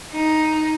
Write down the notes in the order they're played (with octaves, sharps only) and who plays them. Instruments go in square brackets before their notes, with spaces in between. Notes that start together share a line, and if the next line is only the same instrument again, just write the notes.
[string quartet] D#4